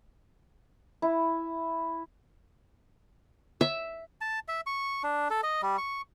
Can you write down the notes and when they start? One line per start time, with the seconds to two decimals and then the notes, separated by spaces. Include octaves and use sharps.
1.02 E4
3.61 E5
4.21 A5
4.48 E5
4.66 C#6
5.03 D4
5.30 A4
5.43 D#5
5.62 G3
5.78 C#6